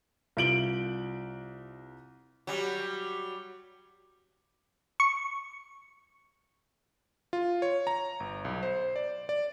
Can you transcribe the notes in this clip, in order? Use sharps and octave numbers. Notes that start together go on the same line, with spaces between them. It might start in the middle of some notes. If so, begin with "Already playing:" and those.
C2 F4 D7 F#7 G7
F#3 G3
C#6
F4
C#5
A#5
G1
B1
C5
D5
D5